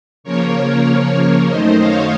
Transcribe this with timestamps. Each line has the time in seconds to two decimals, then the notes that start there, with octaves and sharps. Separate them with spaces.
0.24 C#3 F3 A#3 A#4 C#5
1.48 F#2 D#3 A3 D#4 C5 D#5
1.79 C#5 F5